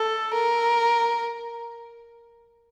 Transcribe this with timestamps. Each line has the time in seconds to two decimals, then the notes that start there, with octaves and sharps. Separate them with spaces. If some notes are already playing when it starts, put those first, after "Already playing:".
Already playing: A4
0.34 A#4